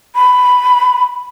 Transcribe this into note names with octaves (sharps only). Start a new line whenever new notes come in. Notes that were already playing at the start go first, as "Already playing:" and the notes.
B5